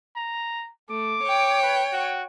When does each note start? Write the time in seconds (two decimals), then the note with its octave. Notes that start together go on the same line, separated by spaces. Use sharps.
0.16 A#5
0.90 A3 D6
1.23 C#5 G5
1.63 B4
1.92 F#4